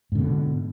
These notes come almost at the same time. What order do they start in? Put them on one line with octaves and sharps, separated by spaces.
G#2 D3 B2